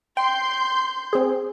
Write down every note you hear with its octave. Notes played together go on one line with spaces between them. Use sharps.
G5 C6 G6
C4 G#4